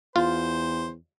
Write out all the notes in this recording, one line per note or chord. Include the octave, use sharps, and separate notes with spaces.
E2 F4 C5